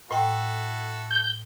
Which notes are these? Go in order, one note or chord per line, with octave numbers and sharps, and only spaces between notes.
A2 E4 F#4 A4 G5
G6